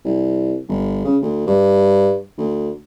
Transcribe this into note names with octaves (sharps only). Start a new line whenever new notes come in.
C2
G1
C#3
D2
G2
D2